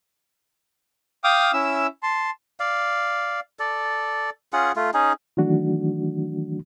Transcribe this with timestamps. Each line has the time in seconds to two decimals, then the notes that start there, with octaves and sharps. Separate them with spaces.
1.24 F5 G5 D6 D#6 F6
1.53 C#4 E4 E5 E6
2.03 A5 C6
2.60 D5 F5
3.59 A4 D5
4.53 C#4 F4 G#4 F#5
4.76 A3 F4
4.94 C#4 D#4 G#4
5.37 D#3 E3 F#3 A3 D4 F#4